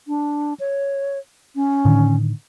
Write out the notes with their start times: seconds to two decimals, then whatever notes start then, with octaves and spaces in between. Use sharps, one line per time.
0.08 D4
0.60 C#5
1.56 C#4
1.85 A2 D3 D#3